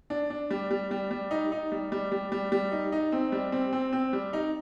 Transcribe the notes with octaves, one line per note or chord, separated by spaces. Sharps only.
D4
D4
G3
G3
G3
G3
D#4
D#4
G3
G3
G3
G3
G3
D#4
D#4
C4
G3
C4
C4
C4
G3
D#4